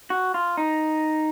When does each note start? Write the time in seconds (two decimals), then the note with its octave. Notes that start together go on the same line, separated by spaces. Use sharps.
0.10 F#4
0.34 F4
0.57 D#4